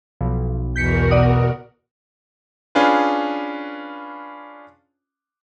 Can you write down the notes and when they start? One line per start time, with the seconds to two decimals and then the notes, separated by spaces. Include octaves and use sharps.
0.21 B1 F3
0.76 E2 B2 E3 F#4 A#4 G6 B6 C#7
1.11 D5 F#5 D#6
2.75 C#4 D4 F4 G#4 B4